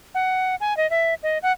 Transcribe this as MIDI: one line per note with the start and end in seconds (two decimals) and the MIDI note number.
0.15 0.55 78
0.61 0.76 80
0.77 0.89 75
0.90 1.14 76
1.23 1.38 75
1.43 1.52 78